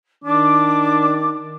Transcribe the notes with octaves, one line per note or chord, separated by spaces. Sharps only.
D#3 D4 D6